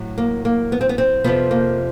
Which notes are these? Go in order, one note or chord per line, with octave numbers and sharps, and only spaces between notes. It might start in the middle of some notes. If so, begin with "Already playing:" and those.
Already playing: A2 F#3
A#3
A#3
B3
C4
B3
C4
F2 C3 F3 B3
A#3